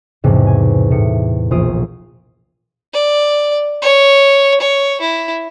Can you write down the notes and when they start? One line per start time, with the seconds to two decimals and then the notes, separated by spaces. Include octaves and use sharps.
0.24 B1 E2 G#2 C3
0.47 G#5
0.91 A2 C#7
1.51 E1 A#1 F4 D#6 D7
2.94 D5
3.82 C#5
4.60 C#5
5.01 E4